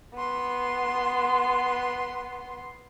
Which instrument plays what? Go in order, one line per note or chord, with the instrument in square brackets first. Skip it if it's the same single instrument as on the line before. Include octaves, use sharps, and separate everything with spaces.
[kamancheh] B3 C6